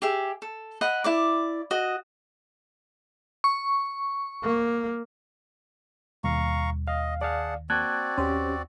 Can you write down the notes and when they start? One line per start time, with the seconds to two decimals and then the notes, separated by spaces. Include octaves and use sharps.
0.02 G4 G#4 E5
0.42 A4
0.81 D#5 F#5 B5
1.04 E4 D5 D6
1.71 F#4 D#5
3.44 C#6
4.44 A#3
6.24 D#2 B2 D#3 G3 F5 A#5 C#6
6.88 D#5 F5
7.21 G#4 D5 F5 F#5 A5
7.70 A#3 C4 F#4 D5 A5 F#6 G#6
8.18 D#2 C#4 G4 C5